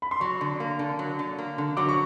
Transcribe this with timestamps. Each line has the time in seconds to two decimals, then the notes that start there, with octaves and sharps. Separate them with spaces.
0.02 B5
0.11 C6
0.20 F#3 C#6
0.41 D3
0.60 A#3
0.79 D3
0.99 F#3
1.19 D3
1.38 A#3
1.58 D3
1.77 F#3 D6
1.89 C#6